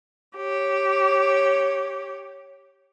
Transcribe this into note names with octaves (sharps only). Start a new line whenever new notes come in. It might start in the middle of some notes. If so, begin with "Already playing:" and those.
G4 C#5